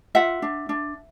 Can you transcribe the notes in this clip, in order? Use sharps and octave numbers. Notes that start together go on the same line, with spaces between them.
F4 E5 F#5
D4
D4